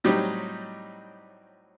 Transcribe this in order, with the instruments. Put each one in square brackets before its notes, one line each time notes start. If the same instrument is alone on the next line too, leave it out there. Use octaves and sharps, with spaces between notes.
[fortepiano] A2 F#3 G3 C4 D#4 G4